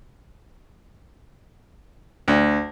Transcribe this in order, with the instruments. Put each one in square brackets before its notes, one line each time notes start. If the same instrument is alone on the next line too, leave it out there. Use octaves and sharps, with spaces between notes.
[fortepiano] D2